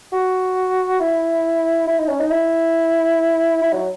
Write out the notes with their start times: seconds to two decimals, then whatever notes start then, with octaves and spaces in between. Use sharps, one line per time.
0.12 F#4
1.00 E4
1.87 E4
1.98 D#4
2.09 C#4
2.19 D#4
2.30 E4
3.61 E4
3.73 F#3